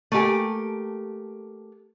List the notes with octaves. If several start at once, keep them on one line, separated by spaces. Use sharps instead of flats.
A3 A#3 D4 G4 G#5